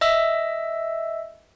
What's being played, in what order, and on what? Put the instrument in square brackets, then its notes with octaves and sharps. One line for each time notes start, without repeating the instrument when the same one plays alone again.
[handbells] D#5 E5 E6